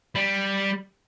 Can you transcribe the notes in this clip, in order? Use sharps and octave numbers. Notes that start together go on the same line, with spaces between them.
G3